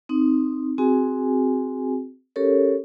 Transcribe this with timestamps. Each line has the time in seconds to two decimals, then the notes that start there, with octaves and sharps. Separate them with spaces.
0.09 C4 D#4
0.78 C4 F#4 G#4 G#5
2.36 C#4 G4 A4 A#4 C#5